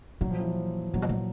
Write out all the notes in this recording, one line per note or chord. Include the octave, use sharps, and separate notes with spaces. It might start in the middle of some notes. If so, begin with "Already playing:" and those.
A#2 F#3
F3
E3
F3
A#2 F#3
B2
A#2